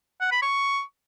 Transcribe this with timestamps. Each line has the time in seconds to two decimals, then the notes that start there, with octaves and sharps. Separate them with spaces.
0.21 F#5
0.32 B5
0.42 C#6